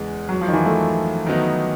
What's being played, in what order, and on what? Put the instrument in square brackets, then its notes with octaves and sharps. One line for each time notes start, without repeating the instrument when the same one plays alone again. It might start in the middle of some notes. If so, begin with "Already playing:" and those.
Already playing: [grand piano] E2 C#3 E3 [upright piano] G#3
[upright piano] F#3
F3
D#3
E3
A3
[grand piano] D#3 F#3 B3 D#4